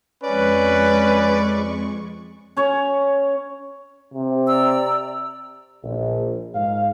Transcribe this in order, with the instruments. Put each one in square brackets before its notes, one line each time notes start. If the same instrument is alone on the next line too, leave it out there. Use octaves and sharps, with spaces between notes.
[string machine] F2 G#3 C#6 [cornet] C#4 [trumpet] B4 [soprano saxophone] D5
[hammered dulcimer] C#4 C#5
[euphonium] C3
[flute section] D5 A#5 E6
[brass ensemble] A#1
G#2 F5